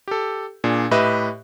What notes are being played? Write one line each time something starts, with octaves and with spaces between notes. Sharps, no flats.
G4 A4
A#2 D4 G#4
A2 G4 B4 D#5 E5